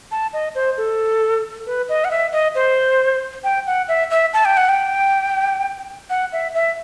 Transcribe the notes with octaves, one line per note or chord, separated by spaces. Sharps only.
A5
D#5
C5
A4
B4
D#5
F#5
E5
D#5
C5
G5
F#5
E5
E5
A5
G5
F#5
G5
F#5
E5
E5